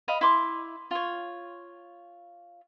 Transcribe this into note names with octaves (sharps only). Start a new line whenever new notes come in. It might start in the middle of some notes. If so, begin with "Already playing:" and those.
D#5 F5 B5
E4 C6 D6
F4 C#5